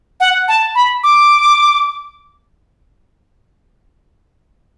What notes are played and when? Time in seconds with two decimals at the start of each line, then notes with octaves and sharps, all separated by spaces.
0.20 F#5
0.48 A5
0.75 B5
1.03 D6